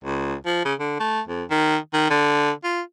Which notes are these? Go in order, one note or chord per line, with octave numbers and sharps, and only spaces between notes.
C#2
F3
C#3
D3
A3
F2
D#3
D#3
D3
F4